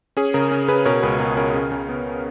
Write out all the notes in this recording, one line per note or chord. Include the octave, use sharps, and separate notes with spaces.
C#4 G#4
C#3 A#4
C#4
C#4 G#4 B4
B2 A#4 C#5
C#2 G#4 B4
B2 A#4
C#4 A#4
C#3
C#3
B3